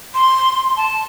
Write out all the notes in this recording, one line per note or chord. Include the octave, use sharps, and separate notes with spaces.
C6
A5